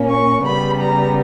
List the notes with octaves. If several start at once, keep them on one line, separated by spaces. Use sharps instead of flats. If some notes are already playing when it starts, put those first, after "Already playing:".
Already playing: A#2 A#3 C#4
C#6
C#3 G3 B3 B5
A#5